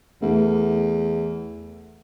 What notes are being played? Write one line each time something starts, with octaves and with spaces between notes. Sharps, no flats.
E2 A3